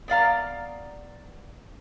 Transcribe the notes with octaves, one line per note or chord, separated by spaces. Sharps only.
B3 D5 F5 A#5